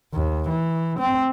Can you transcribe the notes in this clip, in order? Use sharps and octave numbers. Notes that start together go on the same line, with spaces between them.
D#2
E3
C4